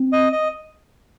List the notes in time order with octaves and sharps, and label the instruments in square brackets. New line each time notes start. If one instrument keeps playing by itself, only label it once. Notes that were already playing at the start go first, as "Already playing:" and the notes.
Already playing: [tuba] C4
[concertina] D#5
D#5